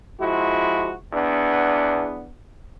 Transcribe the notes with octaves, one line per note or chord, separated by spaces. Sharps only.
F3 G#3 E4 F#4
E2 B3 D4